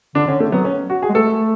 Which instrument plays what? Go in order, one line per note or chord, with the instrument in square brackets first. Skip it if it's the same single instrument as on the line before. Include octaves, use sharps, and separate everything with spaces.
[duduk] D3 [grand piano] D4
[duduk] D3 [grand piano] C#4
[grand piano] A3
[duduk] F#3 [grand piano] B3
[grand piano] C#4
F#4
G#4
[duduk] G#3
[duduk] A3 [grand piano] A4